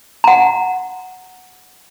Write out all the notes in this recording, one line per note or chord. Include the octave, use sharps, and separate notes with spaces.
F#5 A#5